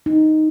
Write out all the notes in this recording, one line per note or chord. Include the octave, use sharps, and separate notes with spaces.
D#4